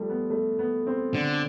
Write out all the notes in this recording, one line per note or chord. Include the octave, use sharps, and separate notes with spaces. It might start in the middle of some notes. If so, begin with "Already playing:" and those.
Already playing: F3 G3 A3
B3
A3
B3
C4
D3